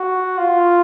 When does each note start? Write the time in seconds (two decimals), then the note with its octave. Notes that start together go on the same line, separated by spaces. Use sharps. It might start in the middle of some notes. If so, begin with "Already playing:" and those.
Already playing: F#4
0.38 F4